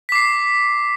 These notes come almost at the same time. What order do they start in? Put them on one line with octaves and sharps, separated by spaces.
B6 D6 C7